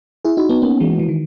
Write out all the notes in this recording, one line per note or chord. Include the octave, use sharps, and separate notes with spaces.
E4 G#4
D#4 F#4
B3 D#4
A#3 C#4
E3 G#3
E3
D#3